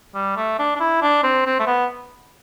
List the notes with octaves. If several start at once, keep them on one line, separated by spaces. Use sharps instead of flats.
G3
A3
D4
D4
E4
D4
C4
C4
A3
B3